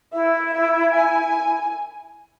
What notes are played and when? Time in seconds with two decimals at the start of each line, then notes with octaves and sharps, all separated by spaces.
0.13 E4 E5
0.53 E5
0.93 G#5